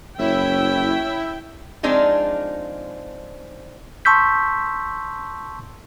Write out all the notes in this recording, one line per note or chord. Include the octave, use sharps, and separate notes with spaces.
F#1 C#4 E4 C#5 E5 G5
F3 G#3 C4 D4 D#4 F4
A5 C6 C#6 E6 G6 B6